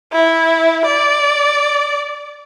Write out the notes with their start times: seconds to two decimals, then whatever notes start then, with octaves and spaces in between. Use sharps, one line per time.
0.12 E4
0.85 D5